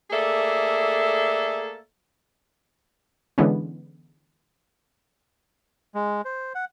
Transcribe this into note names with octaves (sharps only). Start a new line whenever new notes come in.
A3 A#3 G#4 A4 D5 E5
D3 E3 G#3 B3 C#4
G#3
C5
F#5